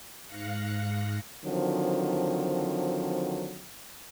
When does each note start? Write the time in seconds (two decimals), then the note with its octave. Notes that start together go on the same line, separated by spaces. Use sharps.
0.25 G#2 F5 F#6 A#6 C#7
1.44 D3 D#3 F3 F#3 C4